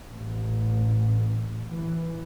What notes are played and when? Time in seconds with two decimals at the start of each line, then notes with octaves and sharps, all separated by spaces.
0.11 A1
1.70 E3